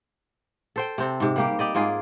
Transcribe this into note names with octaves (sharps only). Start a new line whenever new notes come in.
A4 C5 G5
C3 C4 A4
G#2 C3
G3 A#3 G4
G4 D5 D#5
G#2 A#3 F4 G#4